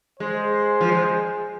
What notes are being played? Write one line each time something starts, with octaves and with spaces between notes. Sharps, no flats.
G#3 C5
F3
G#3